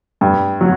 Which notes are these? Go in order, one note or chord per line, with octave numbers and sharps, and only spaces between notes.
G2
F#3